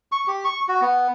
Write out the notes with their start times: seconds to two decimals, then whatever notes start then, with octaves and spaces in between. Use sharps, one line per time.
0.12 C#6
0.27 G4
0.45 C#6
0.69 F#4
0.81 B3